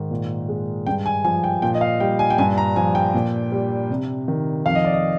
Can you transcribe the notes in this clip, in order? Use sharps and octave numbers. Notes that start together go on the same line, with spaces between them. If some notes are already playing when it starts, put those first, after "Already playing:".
Already playing: G#2 D#3
A#2
G#3
G2 G5
G#5
F3 G#5
G5
A#2 G5
D#5
F5
G3 G5
G#5
G5
G2 G#5
A#5
F3 G#5
G5
A#2
G3
C3
D#3
F2 F5
D#5
D5
D#5